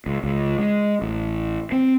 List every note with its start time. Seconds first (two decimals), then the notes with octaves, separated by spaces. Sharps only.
0.06 C#2
0.24 C#2
0.59 G#3
1.02 A1
1.72 C4